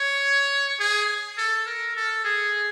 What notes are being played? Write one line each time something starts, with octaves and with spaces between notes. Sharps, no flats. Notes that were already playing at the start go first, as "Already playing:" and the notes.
Already playing: C#5
G#4
A4
A#4
A4
G#4